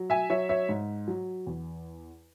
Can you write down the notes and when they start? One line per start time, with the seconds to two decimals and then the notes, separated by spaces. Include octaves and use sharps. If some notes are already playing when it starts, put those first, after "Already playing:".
Already playing: F#3
0.10 E5 G#5
0.30 F#3 C#5 E5
0.49 C#5 E5
0.69 G#2
1.08 F#3
1.46 E2